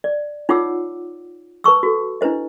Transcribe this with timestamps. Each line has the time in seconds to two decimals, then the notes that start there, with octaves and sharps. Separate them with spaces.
0.04 D5
0.49 D#4 F4 C#5 F#5 D6 E6
1.64 B4 A5 C#6 E6
1.83 F#4 A4
2.21 D4 E4 B4 C5 D#5